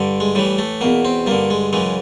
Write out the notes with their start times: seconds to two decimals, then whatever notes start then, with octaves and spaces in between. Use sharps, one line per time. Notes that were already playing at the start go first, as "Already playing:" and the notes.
Already playing: G2 D3
0.20 G#3
0.35 A2 E3 G3
0.58 A3
0.81 E2 B2 A#3
1.05 C4
1.26 G2 D3 A#3
1.50 G#3
1.73 F#2 C#3 E3 G#3